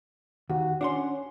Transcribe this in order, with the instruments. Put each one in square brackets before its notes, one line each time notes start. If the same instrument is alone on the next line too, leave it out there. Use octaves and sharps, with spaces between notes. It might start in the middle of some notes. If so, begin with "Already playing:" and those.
[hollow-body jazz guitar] D#2 [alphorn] F#4
[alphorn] C#4 [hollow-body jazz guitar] D4 F#5 C6